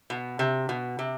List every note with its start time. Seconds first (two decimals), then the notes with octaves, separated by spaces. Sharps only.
0.10 B2
0.39 C3
0.69 B2
0.99 C3